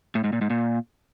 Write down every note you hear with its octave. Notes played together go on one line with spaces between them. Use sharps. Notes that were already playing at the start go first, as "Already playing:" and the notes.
A2
G#2
A#2
G#2
A#2